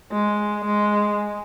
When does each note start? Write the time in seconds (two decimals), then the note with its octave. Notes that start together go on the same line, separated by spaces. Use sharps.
0.12 G#3
0.65 G#3